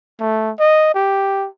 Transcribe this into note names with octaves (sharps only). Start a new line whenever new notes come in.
A3
D#5
G4